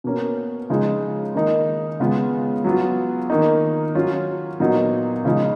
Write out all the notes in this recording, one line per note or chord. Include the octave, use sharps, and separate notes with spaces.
B2 A#3 C#4
C#3 F3 G#3 D#4
D#3 A#3 D#4
C#3 G#3 B3 F4
F#3 B3 F4
D#3 A#3 D#4
F#3 C#4 F4
A#2 F#3 B3 D#4
C#3 F3 G#3 D#4